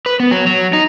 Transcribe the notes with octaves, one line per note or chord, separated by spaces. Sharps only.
B4
B3
F#3
F#3
D#4